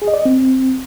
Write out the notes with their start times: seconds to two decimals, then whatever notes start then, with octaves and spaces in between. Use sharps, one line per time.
0.02 G#4
0.08 D#5
0.14 D5
0.19 D#5
0.25 C4